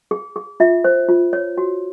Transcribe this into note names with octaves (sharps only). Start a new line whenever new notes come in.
G#4
G#4
F4 E5
C5
F4
C#5
F#4